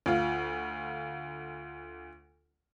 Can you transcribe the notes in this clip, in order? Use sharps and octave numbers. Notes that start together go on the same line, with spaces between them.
D2 F4